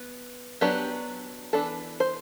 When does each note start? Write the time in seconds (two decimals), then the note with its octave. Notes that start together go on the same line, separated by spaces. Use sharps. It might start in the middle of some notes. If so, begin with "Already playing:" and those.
Already playing: B3
0.61 F#3 B3 D4 G4
1.53 E3 B3 D4 A4
2.00 C5